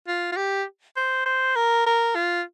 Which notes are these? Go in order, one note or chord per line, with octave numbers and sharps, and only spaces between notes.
F4
F4
G4
C5
C5
A#4
A#4
F4